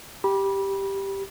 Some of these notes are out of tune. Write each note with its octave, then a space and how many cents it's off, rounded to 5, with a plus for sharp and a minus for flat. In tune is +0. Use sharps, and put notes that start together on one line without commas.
G4 +0 B5 -25